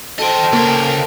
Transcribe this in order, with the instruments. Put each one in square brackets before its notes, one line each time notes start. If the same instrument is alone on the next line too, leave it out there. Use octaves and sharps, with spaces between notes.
[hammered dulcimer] A4 C5 [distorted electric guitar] D#5 G5
[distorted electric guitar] C#2 [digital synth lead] A#3 [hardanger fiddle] A#4 G5